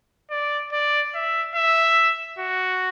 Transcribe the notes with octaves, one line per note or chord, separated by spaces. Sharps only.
D5
D5
E5
E5
F#4